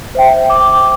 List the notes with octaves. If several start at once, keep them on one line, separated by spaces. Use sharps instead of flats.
C5 E5 G5
C5 G5 D6